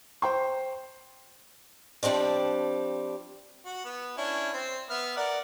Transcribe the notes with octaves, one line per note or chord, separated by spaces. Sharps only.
C5 G5 C6
F3 G3 G#3 C4 D4
F#4
B3
C#4 D4 E4
C4
B3 E5 F6
A#4 D5 F#5